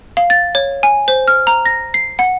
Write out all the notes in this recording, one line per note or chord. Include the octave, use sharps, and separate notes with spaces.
F5
A6
C#5
G#5
C5
F6
A#5
A#6
C7
F#5